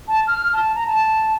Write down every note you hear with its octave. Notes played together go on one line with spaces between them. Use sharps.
A5
F6
A5
A#5
A5